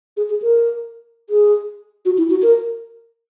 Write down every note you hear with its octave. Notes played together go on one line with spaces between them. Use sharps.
G#4
G#4
A#4
G#4
F#4
E4
F#4
A#4